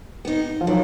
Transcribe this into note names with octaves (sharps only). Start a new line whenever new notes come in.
B3 D#4
F3
D#3 F#3